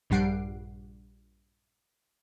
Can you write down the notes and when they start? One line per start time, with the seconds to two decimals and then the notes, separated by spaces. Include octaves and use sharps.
0.10 A#1 G2 G3 F#5 C7 D7